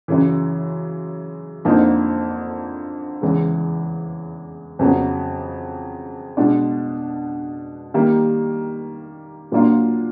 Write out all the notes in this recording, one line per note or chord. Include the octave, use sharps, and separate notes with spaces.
F#2 C#3 E3
F2 D3 F3 A#3 D#4
E2 C#3 E3 G#3
F2 C#3 F#3 B3
B2 G#3 B3 D4
D#3 G3 A#3
A#2 F#3 A#3 D4 F4